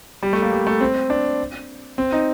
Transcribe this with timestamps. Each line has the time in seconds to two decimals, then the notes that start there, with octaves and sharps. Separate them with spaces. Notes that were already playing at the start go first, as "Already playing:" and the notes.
0.23 G3
0.33 A3
0.42 A#3
0.52 G3
0.67 A3
0.81 C4
1.10 D4
1.98 C4
2.12 D#4